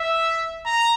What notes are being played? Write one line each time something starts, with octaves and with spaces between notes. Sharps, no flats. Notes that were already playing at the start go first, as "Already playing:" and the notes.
Already playing: E5
A#5